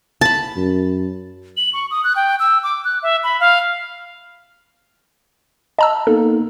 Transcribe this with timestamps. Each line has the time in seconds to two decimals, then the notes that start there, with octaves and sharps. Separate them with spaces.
0.21 A5 B5
0.57 F#2
1.57 F#7
1.73 C#6
1.91 D#6
2.04 F#6
2.16 G5
2.39 E6
2.63 D6
2.85 F#6
3.03 E5
3.24 B5
3.40 F5
5.79 D#5 A5 A#5 E6
6.07 A#3 B3 D#4 A4